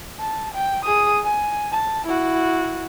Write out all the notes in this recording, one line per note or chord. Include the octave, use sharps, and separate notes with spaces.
A5
G5
G#4 D#6
G#5
A5
E4 F#4